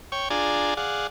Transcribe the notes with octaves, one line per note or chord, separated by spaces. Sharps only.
C#5 G5 C#6
D4 F4 G#4 D5 G#5 A#5
G#4 D5 F5 F#5